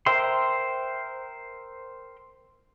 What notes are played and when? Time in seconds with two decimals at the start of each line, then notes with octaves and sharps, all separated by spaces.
0.06 A#4 C5 E5 G5 C6